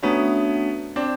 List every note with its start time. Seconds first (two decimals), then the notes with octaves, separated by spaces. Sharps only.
0.03 A3 B3 C#4 D4 F#4
0.96 C4 D4